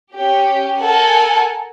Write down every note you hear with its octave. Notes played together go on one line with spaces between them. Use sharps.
C#4 G4
A4 A#4 F#5 G#5